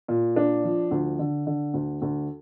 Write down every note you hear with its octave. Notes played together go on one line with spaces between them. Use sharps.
A#2
D4
F3
D2
D3
D3
D2
D2